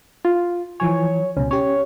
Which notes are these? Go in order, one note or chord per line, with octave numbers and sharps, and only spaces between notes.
F4
E3 F3 C#5 G#5
C#2 B2 C#4
C#4 G4 C#5